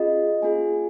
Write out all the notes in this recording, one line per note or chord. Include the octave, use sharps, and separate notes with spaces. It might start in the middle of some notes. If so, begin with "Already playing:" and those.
Already playing: C#4 F4 G#4 D#5
A#3 F4 G#4 G#5